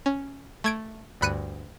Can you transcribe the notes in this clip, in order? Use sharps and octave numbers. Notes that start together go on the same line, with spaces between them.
C#4
A3 G#6 D7
D2 G2 B5 F#6 C#7 D#7